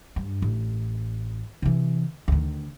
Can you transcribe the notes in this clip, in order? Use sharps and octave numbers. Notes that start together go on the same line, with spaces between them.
G2
A1
C3 E3
D2 D#3